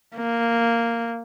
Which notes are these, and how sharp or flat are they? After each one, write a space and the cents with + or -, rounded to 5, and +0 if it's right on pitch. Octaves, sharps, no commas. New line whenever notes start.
A#3 -5